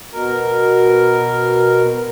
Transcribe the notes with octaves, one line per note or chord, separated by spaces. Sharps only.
B2 A#4